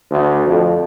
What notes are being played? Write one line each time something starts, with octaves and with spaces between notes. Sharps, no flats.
D2
F2